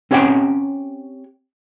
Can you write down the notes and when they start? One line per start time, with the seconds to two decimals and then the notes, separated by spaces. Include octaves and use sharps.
0.11 C4 C#4 G4 C#5 F#5 G5